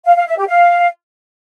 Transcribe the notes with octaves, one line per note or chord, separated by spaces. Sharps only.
F5
F5
E5
G4
F5